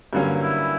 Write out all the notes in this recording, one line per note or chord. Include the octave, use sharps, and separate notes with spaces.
G2 D3 F#3 A#3 C#4
E4